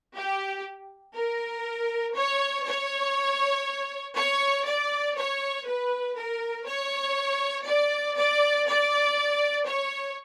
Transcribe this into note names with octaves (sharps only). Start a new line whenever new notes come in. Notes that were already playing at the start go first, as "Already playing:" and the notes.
G4
A#4
C#5
C#5
C#5
D5
C#5
B4
A#4
C#5
D5
D5
D5
C#5